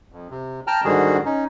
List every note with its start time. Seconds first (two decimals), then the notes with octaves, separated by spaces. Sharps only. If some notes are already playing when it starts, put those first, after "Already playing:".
0.12 F2
0.30 C3
0.67 G5 A5 A#5 F6
0.84 G#2 D3 D#3 G3 F#4 G#4
1.25 C#4 D#4